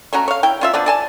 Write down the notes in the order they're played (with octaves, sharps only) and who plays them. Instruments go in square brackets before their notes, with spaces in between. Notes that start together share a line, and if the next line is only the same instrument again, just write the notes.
[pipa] A3 C#4 F#4 A#5
C#5 F5
E4 G5
C#4 F4 E5
F3 B3 D4 D5
D5 G#5 A5